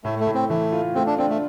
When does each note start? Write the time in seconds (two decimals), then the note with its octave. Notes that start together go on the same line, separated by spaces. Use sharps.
0.04 A2 A3
0.20 A3
0.27 A2
0.34 C4
0.49 E3 A3
0.72 F4
0.95 A3 C4
1.07 D4
1.18 C4 D4
1.30 A3